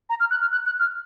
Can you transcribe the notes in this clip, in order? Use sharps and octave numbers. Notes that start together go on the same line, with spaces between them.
A#5
F6
F#6
F6
F#6
F#6
F6